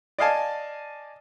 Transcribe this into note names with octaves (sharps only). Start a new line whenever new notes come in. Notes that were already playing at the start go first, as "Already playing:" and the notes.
D5 D#5 F5 G#5 A5